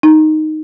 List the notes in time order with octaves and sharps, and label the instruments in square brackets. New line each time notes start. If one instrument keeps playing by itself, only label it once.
[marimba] D#4